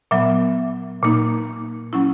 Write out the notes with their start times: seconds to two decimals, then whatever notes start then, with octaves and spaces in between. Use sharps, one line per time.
0.11 A#2 F#3 B3 E5
1.02 A#2 A#3 D#4
1.93 F#3 C#4 E4